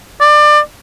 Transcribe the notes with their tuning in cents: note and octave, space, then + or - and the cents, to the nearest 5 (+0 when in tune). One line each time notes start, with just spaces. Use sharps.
D5 +25